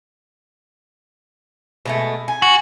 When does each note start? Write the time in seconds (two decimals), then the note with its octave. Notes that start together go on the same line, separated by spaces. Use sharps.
1.85 B2 G#3 A3
2.28 G#5
2.42 F#4